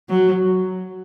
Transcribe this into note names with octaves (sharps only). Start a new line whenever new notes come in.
F#3